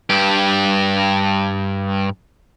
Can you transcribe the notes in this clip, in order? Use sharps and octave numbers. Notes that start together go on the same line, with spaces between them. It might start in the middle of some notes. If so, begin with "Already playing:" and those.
G2 G4